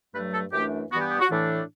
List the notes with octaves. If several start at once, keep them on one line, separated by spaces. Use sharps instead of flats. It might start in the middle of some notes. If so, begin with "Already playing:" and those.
G2 F#3 A3 B4
A4
F#2 E3 A3 D4 G4
G2 E3 B3 F#4
G4
G4
F#4
A2 E3 A3 D4